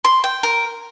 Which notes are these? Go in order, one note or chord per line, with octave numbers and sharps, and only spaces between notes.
C6
G5
A#4